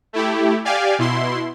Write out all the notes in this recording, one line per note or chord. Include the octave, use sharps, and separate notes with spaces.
A3 E4 G4
G4 D5 F5 G#5
B2 E4 C6